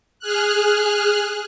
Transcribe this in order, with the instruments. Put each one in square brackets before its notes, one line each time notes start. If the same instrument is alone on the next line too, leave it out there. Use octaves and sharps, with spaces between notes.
[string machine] G#4 F6 F#6